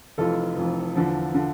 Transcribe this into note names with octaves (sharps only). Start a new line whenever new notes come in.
F1 F2 E3 F4 A4
F1 F2 E3
E2 D3 F3
D3 F3